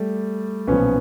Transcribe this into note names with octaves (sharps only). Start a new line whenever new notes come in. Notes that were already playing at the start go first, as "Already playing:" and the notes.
Already playing: G3 A3
B1 A#2 F3 B3 C#4